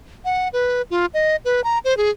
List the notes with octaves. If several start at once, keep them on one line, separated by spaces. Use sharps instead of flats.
F#5
B4
F4
D#5
B4
A#5
C5
G#4